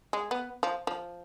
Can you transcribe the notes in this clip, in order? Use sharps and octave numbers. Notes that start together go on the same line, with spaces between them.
G#3
B3
F3
F3